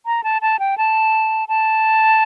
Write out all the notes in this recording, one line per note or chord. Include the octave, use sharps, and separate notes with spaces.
A#5
A5
A5
G5
A5
A5